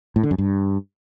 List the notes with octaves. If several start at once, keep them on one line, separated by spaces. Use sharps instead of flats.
A2
D3
F#2
G2